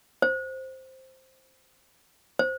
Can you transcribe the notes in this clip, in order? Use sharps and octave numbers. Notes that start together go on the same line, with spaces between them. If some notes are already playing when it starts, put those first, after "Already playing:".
C5
C5